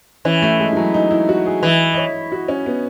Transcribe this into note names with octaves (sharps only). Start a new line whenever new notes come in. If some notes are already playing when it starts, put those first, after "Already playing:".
E3 C#4
A3
G#3
E3
F#3
D#4
E4
F#4
G#4
E3 D#5
D#5
C#5
F#4
C#4
B3